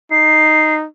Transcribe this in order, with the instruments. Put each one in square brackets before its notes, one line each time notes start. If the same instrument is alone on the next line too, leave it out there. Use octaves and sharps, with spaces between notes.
[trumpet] D#4 [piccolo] C7